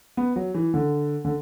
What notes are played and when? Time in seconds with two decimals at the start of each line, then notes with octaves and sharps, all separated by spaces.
0.17 B3
0.36 F#3
0.54 E3
0.74 D3
1.25 D3